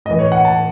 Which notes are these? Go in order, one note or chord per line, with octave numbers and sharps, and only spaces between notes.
A2 E3 D#5
C#5
F#5
A5